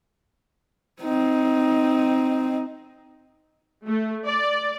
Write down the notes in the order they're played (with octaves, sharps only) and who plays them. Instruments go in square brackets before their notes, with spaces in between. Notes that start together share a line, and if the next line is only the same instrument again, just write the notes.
[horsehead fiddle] C4 D#4
[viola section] A3
D5